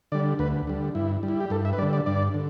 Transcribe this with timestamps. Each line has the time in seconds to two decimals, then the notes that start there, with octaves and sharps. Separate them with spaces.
0.12 D3 G3 D5
0.39 D2 B4
0.67 D3 G3
0.95 G2 E4
1.23 G3
1.28 E4
1.40 G4
1.50 G2 A4
1.65 E5
1.73 B4
1.78 G3 D5
1.82 D3
1.93 D5
2.06 G2 D5
2.34 D3